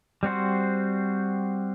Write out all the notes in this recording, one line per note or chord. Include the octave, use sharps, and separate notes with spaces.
G3 C4 F#4 C5